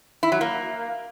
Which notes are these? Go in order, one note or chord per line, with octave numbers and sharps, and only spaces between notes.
E4
F#3
A#3